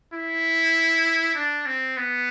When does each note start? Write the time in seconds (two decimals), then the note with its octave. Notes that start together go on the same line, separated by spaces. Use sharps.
0.13 E4
1.35 D4
1.66 C4
1.97 B3